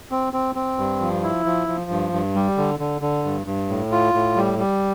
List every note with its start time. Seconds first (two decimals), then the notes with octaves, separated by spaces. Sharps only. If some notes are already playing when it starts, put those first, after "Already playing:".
0.11 C4
0.33 C4
0.55 C4
0.78 G2
1.01 F3
1.23 E4
1.46 F3
1.68 F3
1.91 G2
2.13 G2
2.35 G3
2.57 D3
2.79 D3
3.02 D3
3.24 G2
3.46 G2
3.69 A2
3.92 F4
4.14 A2
4.36 G3
4.59 G3